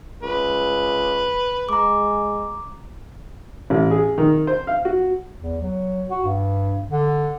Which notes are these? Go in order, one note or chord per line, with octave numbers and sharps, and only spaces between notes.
C#2 B4
G#3 A#5 D6
A1
G#4
D#3
C5
F5
F#4
E2
F#3
F#4
G2
D3